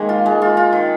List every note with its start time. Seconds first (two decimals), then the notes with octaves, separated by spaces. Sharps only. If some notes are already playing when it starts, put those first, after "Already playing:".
Already playing: D#3 G#3 A#3 G#4
0.09 F4
0.26 G#3
0.42 F4
0.57 F4
0.73 D#3